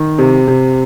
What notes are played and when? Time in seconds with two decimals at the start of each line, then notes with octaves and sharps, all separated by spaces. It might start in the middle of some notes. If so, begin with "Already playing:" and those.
Already playing: D#3
0.18 C3
0.48 C3